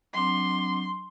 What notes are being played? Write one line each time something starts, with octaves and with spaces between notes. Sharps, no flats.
F#3 C4 D4 C6